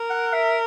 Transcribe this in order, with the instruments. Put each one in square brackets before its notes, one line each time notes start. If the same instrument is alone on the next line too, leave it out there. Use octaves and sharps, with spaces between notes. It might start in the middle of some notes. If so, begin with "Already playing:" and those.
Already playing: [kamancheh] A#4
[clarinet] F#5
E5